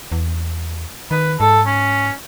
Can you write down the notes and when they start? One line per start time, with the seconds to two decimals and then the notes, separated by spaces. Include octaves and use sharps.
0.12 E2
1.11 D#3 B4
1.40 G#2 A4
1.66 C#4